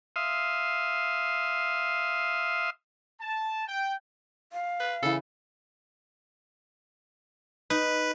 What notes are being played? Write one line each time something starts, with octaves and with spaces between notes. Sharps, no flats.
E5 F5 C6 D#6
A5
G5
F5
B4
C#3 E3 A4
D#4 B4